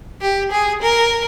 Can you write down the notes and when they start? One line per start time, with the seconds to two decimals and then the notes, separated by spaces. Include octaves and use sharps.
0.21 G4
0.51 G#4
0.82 A#4